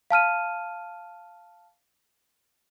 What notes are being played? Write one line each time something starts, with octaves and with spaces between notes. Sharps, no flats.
F5 A5 F6 D#7